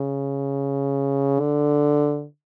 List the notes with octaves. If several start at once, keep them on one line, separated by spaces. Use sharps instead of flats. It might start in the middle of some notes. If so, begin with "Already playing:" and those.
Already playing: C#3
D3